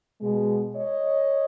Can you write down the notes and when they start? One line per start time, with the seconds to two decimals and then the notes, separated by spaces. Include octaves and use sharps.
0.21 B2 G#3
0.75 C#5 D#5